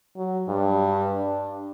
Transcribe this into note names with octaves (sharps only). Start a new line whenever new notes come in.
F#3
G2
D4